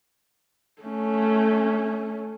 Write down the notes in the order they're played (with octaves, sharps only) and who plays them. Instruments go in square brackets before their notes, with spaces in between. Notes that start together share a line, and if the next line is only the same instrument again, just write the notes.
[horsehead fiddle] A3 C#4